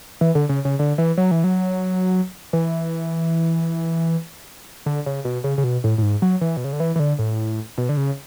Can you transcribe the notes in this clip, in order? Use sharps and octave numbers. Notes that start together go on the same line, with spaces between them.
E3
D3
C#3
C#3
D3
E3
F#3
E3
F#3
E3
D3
C#3
B2
C#3
C#3
B2
A2
A2
G#2
F#3
E3
B2
C#3
D3
E3
E3
D3
A2
B2
D3
C#3